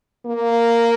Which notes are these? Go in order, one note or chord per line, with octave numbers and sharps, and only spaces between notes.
A#3